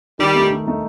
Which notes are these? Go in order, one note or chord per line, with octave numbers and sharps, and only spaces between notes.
D#3 G3
A3 D#4
D#3
A3 D#4